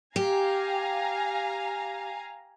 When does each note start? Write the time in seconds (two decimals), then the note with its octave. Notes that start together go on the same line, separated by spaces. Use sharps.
0.16 G4 F5 G#5 A#5